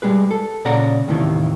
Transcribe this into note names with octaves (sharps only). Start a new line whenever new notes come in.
G3 G#3 G#4 B4
A4
A#2 C#3 D5 F#5 A#5
D#2 A2 C3 D#3 E3